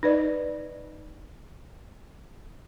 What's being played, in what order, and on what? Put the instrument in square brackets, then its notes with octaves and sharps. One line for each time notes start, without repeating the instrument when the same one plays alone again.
[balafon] D#4 B4 D5 D#5